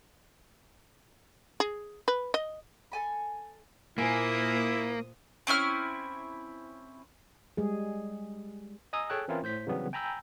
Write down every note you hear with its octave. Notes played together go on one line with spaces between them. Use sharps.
G#4
B4
D#5
A4 G#5 B5
A#2 A#3 E4 C5 G#5 D6 D#6
C4 C#4 E4 F6
G3 G#3 G#4
D#5 G#5 A#5 D#6 E6
G#4 A4 C#5 G5 A5 F#6
E3 C4 C#4 E4 F4 A#4
A2 C5 G6 B6
C#3 E3 F#3 G3 B3 C4
G5 G#5 A#5 B5 E6 G6